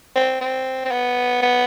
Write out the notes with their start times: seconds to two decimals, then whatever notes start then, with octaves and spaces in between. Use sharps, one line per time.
0.16 C4
0.41 C4
0.85 C4
0.92 B3
1.42 B3